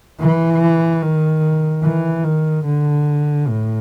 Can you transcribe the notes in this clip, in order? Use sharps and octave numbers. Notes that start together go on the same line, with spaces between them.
E3
D#3
E3
D#3
D3
A2